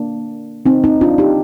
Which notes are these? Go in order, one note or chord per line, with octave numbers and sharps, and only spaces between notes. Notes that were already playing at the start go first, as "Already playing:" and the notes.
Already playing: A#3 D4
C4 D#4
C4 D#4
D4 F4
D#4 G4